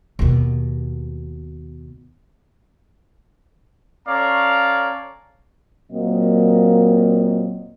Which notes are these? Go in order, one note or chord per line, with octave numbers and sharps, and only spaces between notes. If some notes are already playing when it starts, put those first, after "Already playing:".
D#2 B2
C#4 A4 C#5 D5 F5 A#5
A#2 F#3 A#3 C4 D#5